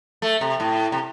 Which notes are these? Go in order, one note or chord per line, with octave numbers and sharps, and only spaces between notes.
A3
C3
A2
C3